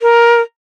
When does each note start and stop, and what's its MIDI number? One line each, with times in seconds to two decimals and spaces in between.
0.01 0.41 70